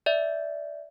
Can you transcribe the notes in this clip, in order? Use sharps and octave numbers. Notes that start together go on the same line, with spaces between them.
D5 E5